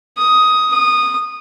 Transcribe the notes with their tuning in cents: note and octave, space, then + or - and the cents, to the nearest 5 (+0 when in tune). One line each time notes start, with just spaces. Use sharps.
D#6 +10
D#6 -15